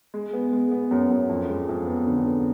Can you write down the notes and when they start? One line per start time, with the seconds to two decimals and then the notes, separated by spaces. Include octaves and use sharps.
0.14 G#3
0.33 B3
0.52 G#3
0.72 B3
0.91 F#2
1.10 F#2
1.29 F2
1.49 G#3
1.69 F2
1.87 B3
2.07 D3
2.26 B3